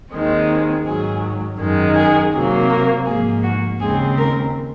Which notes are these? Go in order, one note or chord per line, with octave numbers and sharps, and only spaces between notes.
D#2 D#3 G#3 C4
G#2 D#3 F#3 G#4
F#2 D#3 G#3
G#4
C3 F#3 A#3
A#4
G#2 F3 A#3 G#4
F#4
D#2 C#3 G#3 C4 G#4
A#4